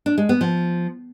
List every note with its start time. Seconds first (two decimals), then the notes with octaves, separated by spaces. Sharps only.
0.06 D4
0.18 G#3
0.29 B3
0.41 F3